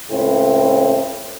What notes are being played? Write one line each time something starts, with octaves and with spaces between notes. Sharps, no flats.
C#2 A2 C4 E4